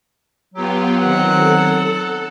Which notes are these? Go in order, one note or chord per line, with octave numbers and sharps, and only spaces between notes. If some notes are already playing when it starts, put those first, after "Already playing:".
F#3 B3 F4 G4
D#3 C4 F#5
A4